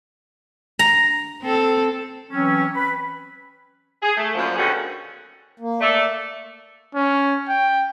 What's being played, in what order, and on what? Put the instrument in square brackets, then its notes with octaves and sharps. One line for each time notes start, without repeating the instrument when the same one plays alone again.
[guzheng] A#5
[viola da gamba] C4 A4
[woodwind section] E3 F#3 C4 C#4
B4 B5
[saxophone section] G#4
A3
F#2 A#2 F3
B2 D3 D#3 C#4 F#4 G#4
[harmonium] A#3
[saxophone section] A3 [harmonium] D5
[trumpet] C#4
G5